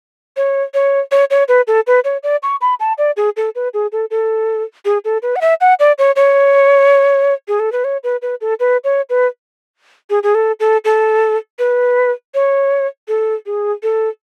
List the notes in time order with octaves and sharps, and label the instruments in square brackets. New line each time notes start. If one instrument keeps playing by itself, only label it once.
[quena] C#5
C#5
C#5
C#5
B4
A4
B4
C#5
D5
C#6
B5
A5
D5
G#4
A4
B4
G#4
A4
A4
G#4
A4
B4
F#5
E5
F#5
D5
C#5
C#5
G#4
A4
B4
C#5
B4
B4
A4
B4
C#5
B4
G#4
G#4
A4
A4
A4
B4
C#5
A4
G#4
A4